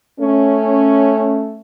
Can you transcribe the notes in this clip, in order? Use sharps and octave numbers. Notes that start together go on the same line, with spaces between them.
A3 C#4